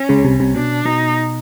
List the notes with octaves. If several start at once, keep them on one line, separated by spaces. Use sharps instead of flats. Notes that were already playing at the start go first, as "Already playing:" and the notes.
Already playing: C#4
C#2 C#3
C2 C3
C2 C3
B2 D4
B2 D#4